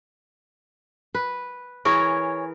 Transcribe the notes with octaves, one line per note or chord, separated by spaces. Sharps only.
B4
E3 G#4 A#4 C#5